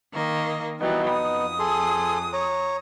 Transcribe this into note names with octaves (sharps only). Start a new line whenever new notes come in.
D#3 A#3 D#5
E3 F#3 G3 B3 D#4
F2 D#6
G#4 A4 C6
C#5 A#5